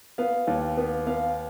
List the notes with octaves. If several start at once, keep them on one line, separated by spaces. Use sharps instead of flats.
B3 F5
D#2
B3
B3 F5